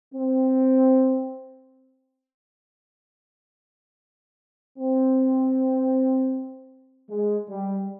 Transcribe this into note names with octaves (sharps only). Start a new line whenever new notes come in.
C4
C4
G#3
G3